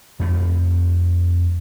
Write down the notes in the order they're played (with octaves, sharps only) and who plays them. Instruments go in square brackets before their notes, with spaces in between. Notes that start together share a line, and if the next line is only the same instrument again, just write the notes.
[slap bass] F2 A3